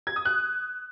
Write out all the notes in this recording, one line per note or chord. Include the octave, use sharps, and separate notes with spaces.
G#6
D#6
F#6